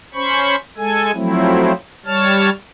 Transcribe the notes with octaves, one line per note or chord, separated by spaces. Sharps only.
C#4 C5 B5 C#6
G#3 A4 G#5
F3 F#3 A3 C4 E4
G3 C#5 A5 F6